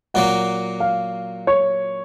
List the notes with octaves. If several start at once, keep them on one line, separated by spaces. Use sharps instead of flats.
A#2 F#3 A#3 F#5
F5
C#5